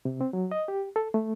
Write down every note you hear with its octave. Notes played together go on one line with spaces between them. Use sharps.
C3
C4
F#3
D#5
G4
A4
A3